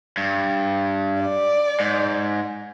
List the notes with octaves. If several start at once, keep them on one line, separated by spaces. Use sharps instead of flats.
G2
D5
G#2